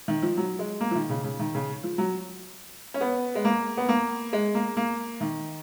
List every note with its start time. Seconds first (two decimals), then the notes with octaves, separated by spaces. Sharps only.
0.08 D#3
0.23 F3
0.37 F#3
0.59 G#3
0.81 A#3
0.91 F3
0.95 D#3
1.10 C#3
1.24 C#3
1.39 D#3
1.55 C#3
1.83 F3
1.98 F#3
2.94 C#4
3.01 B3
3.35 G#3
3.45 A#3
3.77 B3
3.89 A#3
4.33 G#3
4.55 A#3
4.77 A#3
5.21 D#3